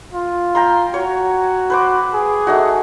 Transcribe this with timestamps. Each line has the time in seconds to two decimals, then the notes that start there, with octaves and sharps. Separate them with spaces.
0.13 F4
0.55 G5 A#5 C6
0.94 F#4 C#5
1.70 B4 C5 D6
2.14 G#4
2.47 A3 D#4 F#4